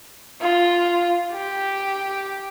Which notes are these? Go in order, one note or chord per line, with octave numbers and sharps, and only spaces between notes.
F4
G4